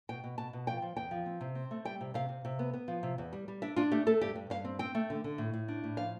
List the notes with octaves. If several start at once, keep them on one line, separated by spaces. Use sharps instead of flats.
B2 G5
B2
B2 A5
B2
F3 G5
F3
E2 G5
F3
C4
C3
C4
A3
G3 G5
C3
C3 F5
C3
C3
B3
B3
F3
C3
E2
G3
G3
D4 E5
D4 F4
A3 G4
A3 A4
G2 G4
G2
G2 F5
C4
C4 G5
A3
D3
D3
A2
A2
D4
A2
F3 F5